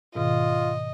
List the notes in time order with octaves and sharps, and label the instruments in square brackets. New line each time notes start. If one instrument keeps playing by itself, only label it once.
[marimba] G#2 B2 D#3 [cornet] F4 [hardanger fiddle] D#5